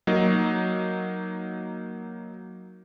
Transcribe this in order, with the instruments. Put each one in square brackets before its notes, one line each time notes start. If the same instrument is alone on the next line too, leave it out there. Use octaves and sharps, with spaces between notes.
[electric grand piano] F#3 A#3 D#4